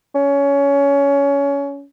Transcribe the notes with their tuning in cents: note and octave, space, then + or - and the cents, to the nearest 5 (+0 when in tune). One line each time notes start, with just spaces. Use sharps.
C#4 +20